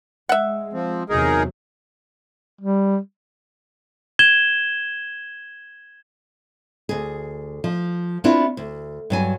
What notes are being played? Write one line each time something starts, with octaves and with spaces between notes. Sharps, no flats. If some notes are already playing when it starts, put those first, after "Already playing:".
G#3 E5 F#5
F3 C4
E2 C3 F#3 D#4 G#4 A#4
G3
G#6 E7 G7
D2 G#4
F3
B3 C4 D4 E4 F4 B4
D2
G2 F#3 G#5